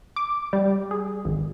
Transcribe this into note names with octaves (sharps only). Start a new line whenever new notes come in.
D6
G3
G#4
G#1